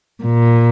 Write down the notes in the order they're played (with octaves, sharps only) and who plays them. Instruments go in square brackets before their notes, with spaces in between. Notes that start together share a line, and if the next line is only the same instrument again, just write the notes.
[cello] A#2